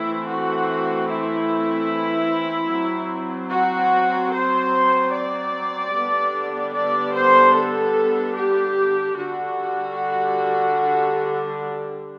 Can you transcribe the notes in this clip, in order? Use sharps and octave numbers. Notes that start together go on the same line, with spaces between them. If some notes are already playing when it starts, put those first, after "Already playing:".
Already playing: E3 A3 C4 E4
F#4
E4
F#3 C4
F#4
C5
D5
D3 G3 B3 D4
D5
C5
A4
G4
D3 G3 D4 F#4